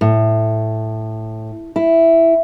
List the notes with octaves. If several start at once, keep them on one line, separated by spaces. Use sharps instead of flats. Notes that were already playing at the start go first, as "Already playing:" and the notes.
A2
E4